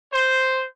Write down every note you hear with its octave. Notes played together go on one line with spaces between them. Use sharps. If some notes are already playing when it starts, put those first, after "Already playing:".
C5